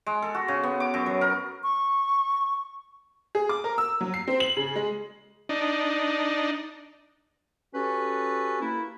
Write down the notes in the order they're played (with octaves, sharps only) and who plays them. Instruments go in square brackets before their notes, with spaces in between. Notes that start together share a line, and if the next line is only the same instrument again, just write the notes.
[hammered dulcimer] G#3
A4
F#4
C#3
B3
D6
F#2
F#3
A#4
[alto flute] C#6
[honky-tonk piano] G#4
D6
A#4
E6
F#3
C7
C4
F#7
C#3
G#3
[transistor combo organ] D4 D#4
[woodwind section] C#4 F#4 G4 A4 B4
A#3 E4